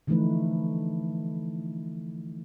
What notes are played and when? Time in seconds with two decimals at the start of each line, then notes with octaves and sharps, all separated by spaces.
0.07 D3 E3 F3 A3 D#4 B4